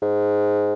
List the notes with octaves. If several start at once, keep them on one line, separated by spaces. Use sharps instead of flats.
G#2